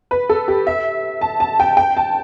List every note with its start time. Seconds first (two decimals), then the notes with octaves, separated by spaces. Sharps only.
0.11 B4
0.29 A4
0.48 G4
0.67 E5
1.21 A5
1.40 A5
1.60 G5
1.77 G5
1.97 A5